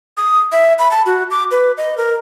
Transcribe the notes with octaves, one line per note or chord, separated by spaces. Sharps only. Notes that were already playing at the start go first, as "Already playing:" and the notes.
D#6
E5
B5
A5
F#4
D6
B4
D#5
A#4